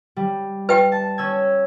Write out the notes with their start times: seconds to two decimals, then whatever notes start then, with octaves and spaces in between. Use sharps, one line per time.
0.16 G3
0.69 B4 E5 G5
0.92 A5
1.18 C#4 E6 G#6